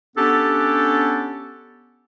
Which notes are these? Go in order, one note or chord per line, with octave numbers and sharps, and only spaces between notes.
B3 C#4 D4 G4 A4